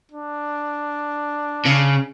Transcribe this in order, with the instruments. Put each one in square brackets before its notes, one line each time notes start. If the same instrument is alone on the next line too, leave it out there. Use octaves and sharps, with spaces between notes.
[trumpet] D4
[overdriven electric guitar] C#3